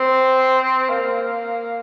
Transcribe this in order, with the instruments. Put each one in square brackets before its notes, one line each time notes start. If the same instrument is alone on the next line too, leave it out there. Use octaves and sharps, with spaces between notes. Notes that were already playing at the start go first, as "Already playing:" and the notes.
Already playing: [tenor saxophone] C4
A#3